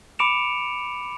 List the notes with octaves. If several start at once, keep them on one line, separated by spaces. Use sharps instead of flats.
B5 D6 C#7 D7 E7 F7